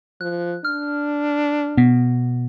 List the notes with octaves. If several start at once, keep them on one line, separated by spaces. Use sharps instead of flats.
F3 F#6
D4 F6
B2 B3